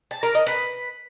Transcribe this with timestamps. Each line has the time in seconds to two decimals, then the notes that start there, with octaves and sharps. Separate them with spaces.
0.11 A5
0.23 A#4
0.35 D#5
0.47 B4